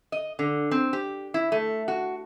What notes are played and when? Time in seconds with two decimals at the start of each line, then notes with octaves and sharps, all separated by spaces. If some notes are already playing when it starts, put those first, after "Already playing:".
0.12 D#5
0.39 D3
0.71 C4
0.93 G4
1.34 E4
1.52 A3
1.88 F#4